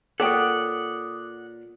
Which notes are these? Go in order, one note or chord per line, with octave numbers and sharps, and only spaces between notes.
A#2 A4 C#5 F#5 G5 D6 D#6